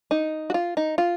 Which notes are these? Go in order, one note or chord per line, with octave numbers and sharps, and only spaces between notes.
D#4
F#4
F4
D#4
F4